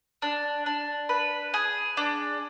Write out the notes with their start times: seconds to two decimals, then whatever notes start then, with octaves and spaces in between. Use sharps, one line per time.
0.22 D4
0.66 D4
1.09 B4
1.54 G#4
1.97 D4